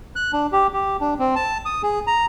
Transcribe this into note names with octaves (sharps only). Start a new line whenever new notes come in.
F#6
D4
G4
G4
D4
C4
A5
D#6
G#4
A#5